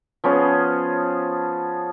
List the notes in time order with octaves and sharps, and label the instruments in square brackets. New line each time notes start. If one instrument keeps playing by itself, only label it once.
[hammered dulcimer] F3 B3 C#4 G#4